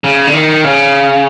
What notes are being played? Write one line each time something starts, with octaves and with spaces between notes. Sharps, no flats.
C#3
D3
D#3
C#3